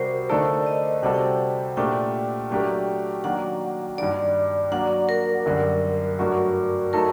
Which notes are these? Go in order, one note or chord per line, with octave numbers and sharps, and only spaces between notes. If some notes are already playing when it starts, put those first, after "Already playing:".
Already playing: C3 G3 C4 F#4 A#4 C5
D3 A3 D#4 A4 D5
D#5
C3 G3 C4 F#4 A4 F#5
G5
F#5
A#2 A3 D4 G4 A#4 G5
F#3 A3 D4 G4 A#4
D#3 F#3 A#3 D4 F#5
G2 D#3 G3 D4 D5
F#3 A#3 D4 F#5
A#4
F#2 D3 G3
G2 F#3 A3 D4 F#4
F#3 A3 D#4 A4 A#4